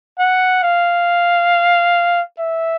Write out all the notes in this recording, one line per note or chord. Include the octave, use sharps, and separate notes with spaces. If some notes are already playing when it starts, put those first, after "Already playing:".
F#5
F5
E5